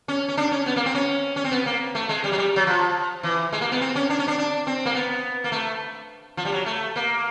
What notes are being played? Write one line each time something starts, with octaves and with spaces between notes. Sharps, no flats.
C#4
C#4
D4
C#4
B3
A#3
C4
C#4
C#4
C4
B3
A#3
A3
G#3
G3
F#3
G3
F#3
F3
E3
G#3
A#3
B3
C4
C#4
D4
C#4
D4
D4
C4
A#3
B3
A#3
A3
F3
G3
F#3
A3
A#3